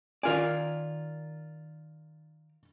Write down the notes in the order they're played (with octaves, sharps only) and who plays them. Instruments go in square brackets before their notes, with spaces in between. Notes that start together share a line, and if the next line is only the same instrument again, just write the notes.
[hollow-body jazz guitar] D#3 A#4 D5 [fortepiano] F4 G#5